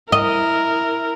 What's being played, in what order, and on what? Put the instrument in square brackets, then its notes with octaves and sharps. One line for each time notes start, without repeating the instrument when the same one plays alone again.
[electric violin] E4 A#4 [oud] D#5